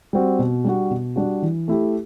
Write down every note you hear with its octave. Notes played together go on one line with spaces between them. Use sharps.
G3 C4 F#4
B2
G3 D4 F#4
B2
G3 D4 F#4
E3
A3 E4 G4